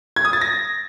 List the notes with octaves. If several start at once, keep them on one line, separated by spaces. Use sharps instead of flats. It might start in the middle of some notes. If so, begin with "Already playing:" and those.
G#6
D#6
A6
A#6